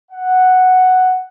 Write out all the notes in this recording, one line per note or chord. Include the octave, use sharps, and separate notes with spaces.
F#5